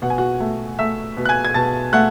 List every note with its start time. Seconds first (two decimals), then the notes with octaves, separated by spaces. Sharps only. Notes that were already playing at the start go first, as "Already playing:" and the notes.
0.02 B2 F#5
0.10 G#5
0.18 F#4 F#5
0.40 A3
0.79 A3 E5 E6
1.17 B2
1.25 F#6
1.29 G#5 G#6
1.45 G#6
1.54 B2 A5 A6
1.93 A3 F#5 F#6